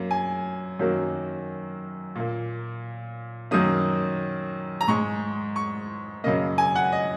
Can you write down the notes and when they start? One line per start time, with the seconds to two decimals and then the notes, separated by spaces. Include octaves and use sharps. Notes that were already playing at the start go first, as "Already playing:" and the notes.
Already playing: F#2 A#3
0.11 G#5
0.79 F#2 D#3 F#3 A#3
2.15 A#2 A#3
3.51 F#2 D#3 F#3 A#3 D#6
4.81 A#5
4.88 G#2 G#3 C#6
5.56 C#6
6.24 F#2 C#3 A#3 D#5
6.58 G#5
6.76 F#5
6.92 D#5